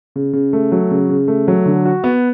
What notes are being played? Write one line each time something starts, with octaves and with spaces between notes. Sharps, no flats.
C#3
C#3
A3
F#3
C#3
C#3
A3
F#3
D3
F#4
B3